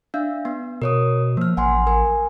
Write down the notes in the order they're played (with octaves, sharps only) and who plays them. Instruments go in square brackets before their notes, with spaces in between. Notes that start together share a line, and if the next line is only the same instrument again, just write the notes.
[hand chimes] D4 E5 F5
B3
[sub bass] B2 [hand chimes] A#4 C#5 D#6
[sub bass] F3 [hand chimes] A#3 F6
[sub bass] A1 [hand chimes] F#5 G#5 C6
[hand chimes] A#4 G#5